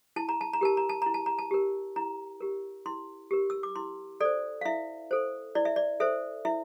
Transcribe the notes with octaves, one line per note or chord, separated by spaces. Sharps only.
E4 A5
A#5
A5
A#5
G4 A#4 A5
A#5
A5
E4 A#5
A5
A#5
A5
G4 A#4
E4 A#5
G4 A#4
E4 C6
G4 A#4
E6
D6
E4 C6
A4 C5 D5
F5
E4 E5
A4 C5
E4 D5
E5
D5
A4 C5 E5
E4 E5